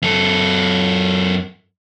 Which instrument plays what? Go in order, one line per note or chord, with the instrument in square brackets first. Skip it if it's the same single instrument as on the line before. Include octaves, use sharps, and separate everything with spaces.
[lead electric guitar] F#2 A4